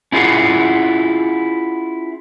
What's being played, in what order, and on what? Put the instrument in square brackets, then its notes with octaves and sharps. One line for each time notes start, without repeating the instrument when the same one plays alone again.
[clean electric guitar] C#4 E4 F4 G#4 F5 F#5